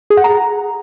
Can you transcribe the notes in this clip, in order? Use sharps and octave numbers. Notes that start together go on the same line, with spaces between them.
G#4
F#5
A#5